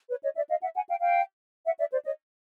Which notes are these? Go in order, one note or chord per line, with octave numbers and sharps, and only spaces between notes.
B4 C#5
C#5 D#5
D5 E5
D#5 F5
E5 F#5
F#5 G#5
F5 G5
F5 G5
E5 F#5
D5 E5
C5 D5
C#5 D#5